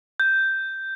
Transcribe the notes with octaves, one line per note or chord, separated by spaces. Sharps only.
G6